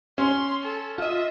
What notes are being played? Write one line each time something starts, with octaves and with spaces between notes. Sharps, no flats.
C#4 C6
A4
F4 D#5 E5